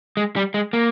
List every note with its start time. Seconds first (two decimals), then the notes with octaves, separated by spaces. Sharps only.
0.17 G#3
0.36 G3
0.54 G#3
0.73 A#3